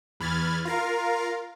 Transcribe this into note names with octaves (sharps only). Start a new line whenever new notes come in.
E2 B5 F6 G#6 A6
F4 A#4 F5